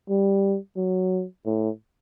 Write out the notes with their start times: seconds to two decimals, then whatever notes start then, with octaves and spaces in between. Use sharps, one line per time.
0.09 G3
0.77 F#3
1.46 A2